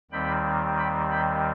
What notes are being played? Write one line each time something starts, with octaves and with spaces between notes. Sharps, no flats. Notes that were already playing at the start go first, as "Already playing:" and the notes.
D#2 D#3 G3 C4 G5 B5
G5 B5
G5 B5